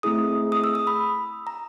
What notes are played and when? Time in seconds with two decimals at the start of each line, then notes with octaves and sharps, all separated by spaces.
0.03 A3 C4 E4 G#4 D#6
0.52 D#6
0.64 E6
0.75 D#6
0.87 B5
1.47 A#5